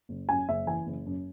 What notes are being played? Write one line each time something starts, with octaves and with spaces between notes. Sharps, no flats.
F#1
F#2 G#5
F#1 E5
E3 G#5
F#1
F#2